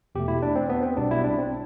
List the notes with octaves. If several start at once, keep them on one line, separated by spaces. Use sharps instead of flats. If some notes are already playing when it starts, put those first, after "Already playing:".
E2 B2 A3 G4
E4
D4
C4
B3
C4
B1 B2 G3 D4
E4
D4
C4